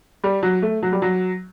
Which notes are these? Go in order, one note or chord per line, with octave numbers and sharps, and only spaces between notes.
G3
F#3
A3
F#3
G3
F#3